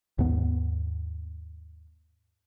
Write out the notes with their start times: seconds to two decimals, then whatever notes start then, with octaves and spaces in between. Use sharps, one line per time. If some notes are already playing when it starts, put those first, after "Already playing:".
0.19 D#2 G#2 B3